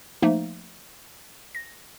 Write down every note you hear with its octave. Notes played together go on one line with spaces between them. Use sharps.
F3 A3 A#3 D#4
A#6